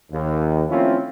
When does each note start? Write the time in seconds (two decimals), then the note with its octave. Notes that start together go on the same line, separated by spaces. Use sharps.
0.12 D#2
0.69 F3 A3 C4 C#4 E4 F4